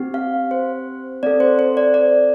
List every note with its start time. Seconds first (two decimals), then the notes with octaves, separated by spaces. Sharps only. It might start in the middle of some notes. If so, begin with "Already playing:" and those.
Already playing: C4 G4
0.14 F5
0.51 C5
1.23 C4 A4 D5
1.40 C5
1.59 C5
1.77 D5
1.94 D5